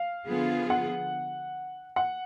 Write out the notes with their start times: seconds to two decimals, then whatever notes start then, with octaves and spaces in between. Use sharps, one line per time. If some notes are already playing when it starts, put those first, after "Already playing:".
Already playing: F5
0.27 D3 F3 B3 F4 G#4
0.70 F#5
1.96 F#5